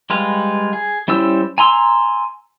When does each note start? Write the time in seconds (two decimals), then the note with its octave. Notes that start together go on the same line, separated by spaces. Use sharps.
0.10 G3 G#3 B4 F5
0.73 G#4
1.08 G3 C#4 E4 C5 E6
1.58 G#5 A#5 C6 E6